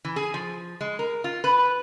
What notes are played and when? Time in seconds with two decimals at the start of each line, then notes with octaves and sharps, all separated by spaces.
0.05 E3
0.16 G#4
0.34 F3
0.81 G#3
0.99 A#4
1.24 F4
1.44 B4